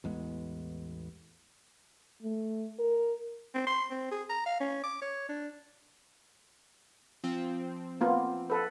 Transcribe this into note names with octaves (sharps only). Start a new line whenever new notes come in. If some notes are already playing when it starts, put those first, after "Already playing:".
A1 E2 G#3 B3
A3
A#4
C4
C6
C4
G#4
A#5
F5
C#4
D6
C#5
D4
F3 C4
A#3 B3 F4
A4 B4